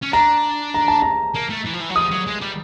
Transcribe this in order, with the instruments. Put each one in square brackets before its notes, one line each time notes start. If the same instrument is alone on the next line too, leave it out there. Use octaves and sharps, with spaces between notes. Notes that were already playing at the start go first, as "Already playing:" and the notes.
[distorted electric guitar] C#4
[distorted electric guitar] D4 [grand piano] A#5
[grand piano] A#5
A5
A#5
[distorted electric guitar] A#3
A3
E3
F3
E3
F#3
[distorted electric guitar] F3 [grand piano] D#6
[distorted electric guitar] F#3
G#3
G3